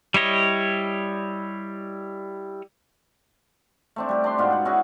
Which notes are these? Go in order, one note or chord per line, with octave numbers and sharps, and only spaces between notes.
G3 E4 C#5 D#5
A3 C4 D4
G3 G4
D4 C6
G#2 B2 B3 F4
F#5 G5
C#4 E4 F#4 G#4